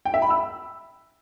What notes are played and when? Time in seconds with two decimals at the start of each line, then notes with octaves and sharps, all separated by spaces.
0.05 G5
0.14 E5
0.22 B5
0.30 E6